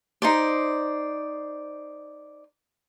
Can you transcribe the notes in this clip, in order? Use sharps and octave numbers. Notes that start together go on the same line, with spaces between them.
D#4 C5 D5